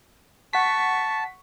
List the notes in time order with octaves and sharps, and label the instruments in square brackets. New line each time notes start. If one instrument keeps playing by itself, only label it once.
[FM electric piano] F#5 B6 [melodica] A5 [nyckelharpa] C#6